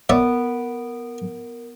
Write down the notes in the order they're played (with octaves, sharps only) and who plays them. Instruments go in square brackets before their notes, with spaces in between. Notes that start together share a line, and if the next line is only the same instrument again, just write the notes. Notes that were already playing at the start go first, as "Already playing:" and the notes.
[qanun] B3 [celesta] A#4 D7 [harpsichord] C#5 D5 E5